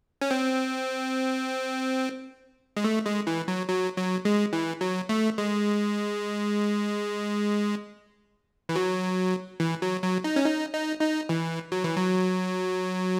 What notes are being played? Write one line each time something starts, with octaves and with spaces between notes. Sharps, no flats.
C#4
C4
G#3
A3
G#3
E3
F#3
F#3
F#3
G#3
E3
F#3
A3
G#3
E3
F#3
E3
F#3
F#3
D#4
C#4
D#4
D#4
D#4
E3
F#3
E3
F#3